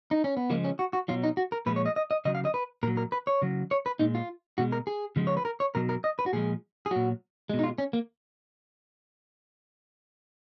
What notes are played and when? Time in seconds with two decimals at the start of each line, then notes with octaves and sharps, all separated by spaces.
0.11 D#4
0.24 C#4
0.37 B3
0.50 C#3 F3 G#3 A#3
0.64 C#4
0.79 F#4
0.93 F#4
1.08 B2 F#3 F4
1.23 D#4
1.37 F#4
1.52 A#4
1.66 A#2 F3 G#3 B4
1.76 C#5
1.86 D#5
1.96 D#5
2.11 D#5
2.25 C#3 F#3 D#5
2.35 F5
2.45 D#5
2.54 B4
2.83 A#2 A#4
2.87 F#3
2.97 A#4
3.12 B4
3.27 C#5
3.42 C#3 F#3
3.71 C#5
3.86 B4
3.99 A#2 G#3 D#4
4.15 F4
4.58 B2 G#3 F#4
4.72 A#4
4.87 G#4
5.16 C#3 F3 G#3
5.27 C#5
5.37 B4
5.45 A#4
5.60 C#5
5.75 B2 F#3 A#4
5.89 A#4
6.04 D#5
6.19 B4
6.26 F#4
6.33 A#2 F3 G#3 G#4
6.86 G#4
6.91 A#2 F#3 F#4
7.50 B2 G#3
7.59 D#4
7.64 F4
7.78 C#4
7.93 A#3